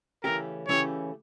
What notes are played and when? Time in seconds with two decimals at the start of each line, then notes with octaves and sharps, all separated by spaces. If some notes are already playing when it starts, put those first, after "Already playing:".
0.24 C#3 E3 A3 C#4 G4 A#4
0.68 C#3 E3 A3 C#4 G4 C#5